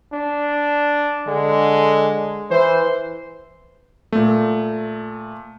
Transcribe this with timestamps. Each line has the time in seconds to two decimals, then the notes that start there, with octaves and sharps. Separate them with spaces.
0.13 D4
1.28 D3 G#3
2.51 E3 C5
4.12 A#2 A3